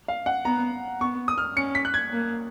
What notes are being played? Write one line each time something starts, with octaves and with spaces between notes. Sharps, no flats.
F5
F#5
B3 A#5
B3 C#6
D#6
F6
C#4 C#7
B6
F#6
G#6
A#3